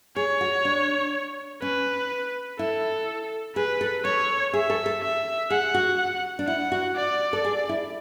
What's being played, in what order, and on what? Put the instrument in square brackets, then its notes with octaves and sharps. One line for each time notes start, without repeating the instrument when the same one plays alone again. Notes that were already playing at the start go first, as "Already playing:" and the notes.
[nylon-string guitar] G#4 [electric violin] C#5
[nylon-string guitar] F#4
D4
[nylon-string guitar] C#4 [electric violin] B4
[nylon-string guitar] E4 [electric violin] A4
[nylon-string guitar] G#4 [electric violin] B4
[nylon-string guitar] A4
[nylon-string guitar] A4 [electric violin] C#5
[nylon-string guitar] G#4 [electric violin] E5
[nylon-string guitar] A4
A4
[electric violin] E5
[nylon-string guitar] G#4 [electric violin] F#5
[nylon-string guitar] F#4
D4
[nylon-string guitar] E4 [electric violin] F#5
[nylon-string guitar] F#4
[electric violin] D5
[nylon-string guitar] A4
G#4
E4